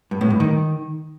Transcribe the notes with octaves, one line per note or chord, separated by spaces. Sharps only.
G2
A2
G2
D#3